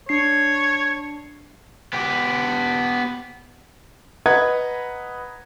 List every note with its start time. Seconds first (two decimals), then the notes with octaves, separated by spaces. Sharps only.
0.09 D4 C#5 C7
1.93 B3 G4
4.26 B4 D#5 F#5 A#5 B5 G#6